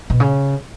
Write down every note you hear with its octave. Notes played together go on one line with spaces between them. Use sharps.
B2
C#3